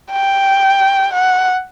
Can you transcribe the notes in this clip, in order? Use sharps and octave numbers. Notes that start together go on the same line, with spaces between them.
G5
F#5